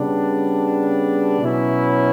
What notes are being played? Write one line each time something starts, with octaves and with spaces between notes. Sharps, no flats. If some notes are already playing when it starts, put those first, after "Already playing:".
Already playing: C#3 G3 B3 D4
B2 F#3 C#4 E4